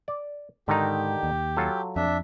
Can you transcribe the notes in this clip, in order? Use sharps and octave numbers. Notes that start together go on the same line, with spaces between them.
D5
G#2 D3 D#3 D#4 G4
D#2
F#3 F4 A4
F2 D4 E5